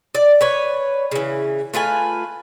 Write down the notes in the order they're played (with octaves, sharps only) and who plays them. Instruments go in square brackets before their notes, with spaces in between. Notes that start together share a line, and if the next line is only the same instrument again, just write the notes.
[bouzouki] D5
B4 C#5
C#3 E3
A3 F4 B4 G#5